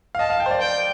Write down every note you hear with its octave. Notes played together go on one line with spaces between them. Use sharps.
F5
D#5 A5
F5
G5
C5
D5
G5